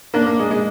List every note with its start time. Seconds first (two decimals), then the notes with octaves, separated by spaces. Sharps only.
0.14 A#3 D4
0.26 A#3
0.39 G#3
0.51 G#3